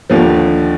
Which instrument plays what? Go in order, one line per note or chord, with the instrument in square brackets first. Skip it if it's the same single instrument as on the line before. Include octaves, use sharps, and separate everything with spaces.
[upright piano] D#2 D3 F3